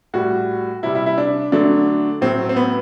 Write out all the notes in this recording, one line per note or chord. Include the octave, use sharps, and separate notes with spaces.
A2 G3 F#4
C3 G3 E4
E4
E4
D4
D3 F#3 A3 D4
A2 F#3 A3 C4
C4
B3